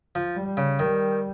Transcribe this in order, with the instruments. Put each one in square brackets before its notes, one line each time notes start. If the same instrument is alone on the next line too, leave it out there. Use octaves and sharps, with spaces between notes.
[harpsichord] F3
[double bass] G3
[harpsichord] C#3
[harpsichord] D#3 [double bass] G3